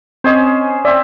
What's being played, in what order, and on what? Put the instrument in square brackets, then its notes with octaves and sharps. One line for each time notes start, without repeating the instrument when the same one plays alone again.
[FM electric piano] C4 D#5 [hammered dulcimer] C#4 G#4 C5
[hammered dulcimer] C4 E5 [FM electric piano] D5